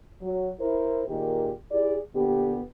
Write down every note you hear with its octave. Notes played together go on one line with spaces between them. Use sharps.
F#3
E4 A#4 C5
A#2 D#3 D#4 G4 G#4 A#4
E4 G4 G#4 D5
A#2 D3 B3 G4